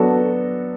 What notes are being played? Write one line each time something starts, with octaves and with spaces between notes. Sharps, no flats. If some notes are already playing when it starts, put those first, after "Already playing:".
Already playing: F#3 B3 D4 F#4 A4